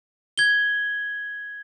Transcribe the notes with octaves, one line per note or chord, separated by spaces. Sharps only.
G#6 G7